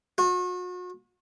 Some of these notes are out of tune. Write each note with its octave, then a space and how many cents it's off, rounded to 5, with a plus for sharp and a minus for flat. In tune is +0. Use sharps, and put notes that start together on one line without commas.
F#4 -40